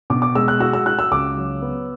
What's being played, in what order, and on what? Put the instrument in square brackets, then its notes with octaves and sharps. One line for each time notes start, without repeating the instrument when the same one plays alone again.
[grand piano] B2 [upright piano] D6
[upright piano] D6
[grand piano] G#3 [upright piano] E6
[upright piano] F#6
[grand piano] F#4 [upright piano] E6
[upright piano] E6
[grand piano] F#4 [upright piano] F#6
[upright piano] E6
[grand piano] C#2 [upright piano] D6
[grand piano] F#3
B3